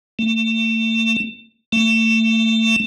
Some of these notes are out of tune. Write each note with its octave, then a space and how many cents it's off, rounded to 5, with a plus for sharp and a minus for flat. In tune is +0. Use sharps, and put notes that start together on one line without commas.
A3 +35
A3 +30